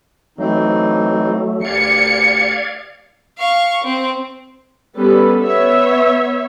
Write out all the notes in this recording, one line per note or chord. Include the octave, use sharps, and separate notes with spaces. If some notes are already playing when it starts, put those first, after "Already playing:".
E3 F#3 A3 C4 D#4
D2 G4 D5 F5 G#6 C#7
F5 C#6
C4
G3 B3 C#4 A4 B4
B3 C#5 E5